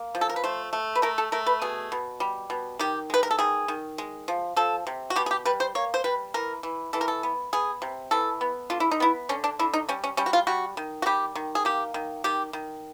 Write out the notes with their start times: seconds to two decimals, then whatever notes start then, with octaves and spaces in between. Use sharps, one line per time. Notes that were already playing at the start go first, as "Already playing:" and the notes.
Already playing: A#3
0.15 F3
0.21 A4
0.29 A#4
0.36 B4
0.44 A3 C5
0.73 A3
0.95 B4
1.02 A3 A#4
1.18 A4
1.32 A3 A#4
1.46 B4
1.62 B2 G#4
1.92 B2
2.20 G3
2.50 B2
2.79 D#3 G4
3.10 G#3 B4
3.23 A#4
3.31 A4
3.39 D#3 G#4
3.68 D#3
3.98 G#3
4.28 F3
4.56 F3 A4
4.87 C3
5.10 F#4
5.16 B2 G4
5.26 G#4
5.31 G4
5.46 G3 B4
5.60 C5
5.75 A#3 C#5
5.94 C5
6.04 G3 B4
6.34 E3 A#4
6.63 E3
6.93 E3 A4
7.01 A#4
7.08 A4
7.23 B3
7.53 B3 G#4
7.82 C3
8.11 E3 A4
8.41 B3
8.70 D3 F4
8.80 E4
8.91 D#4
9.00 B3 E4
9.29 D3 C#4
9.44 D4
9.59 D3 E4
9.74 D#4
9.89 G3 C#4
10.04 C#4
10.17 G3 C#4
10.26 F#4
10.33 F4
10.47 G3 F#4
10.77 D#3
11.02 F#4
11.06 G3 G4
11.35 D#3
11.55 G#4
11.65 A#3 G4
11.94 D#3
12.24 D#3 G4
12.53 D#3